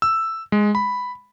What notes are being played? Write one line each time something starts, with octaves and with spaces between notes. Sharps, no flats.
E6
G#3
B5